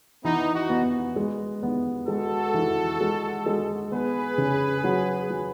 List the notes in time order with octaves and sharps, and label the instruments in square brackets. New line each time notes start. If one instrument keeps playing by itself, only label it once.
[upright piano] E3 [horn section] B3 D#4
[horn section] D#4 F#4
[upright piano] B3
G#3
B3
[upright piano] G#3 [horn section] F#4 A4
[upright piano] E3
G#3
G#3
[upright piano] B3 [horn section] G#4 B4
[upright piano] C#3
F#3
F#3